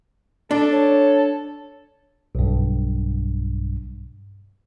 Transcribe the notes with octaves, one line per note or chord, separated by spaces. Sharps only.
D4 A4
C#5
B1 G2